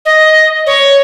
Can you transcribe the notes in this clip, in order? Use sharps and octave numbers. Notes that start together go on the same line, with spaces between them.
D#5
C#5